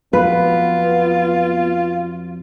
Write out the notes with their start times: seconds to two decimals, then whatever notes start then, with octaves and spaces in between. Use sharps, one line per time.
0.13 F2 F#3 B3 F4 B4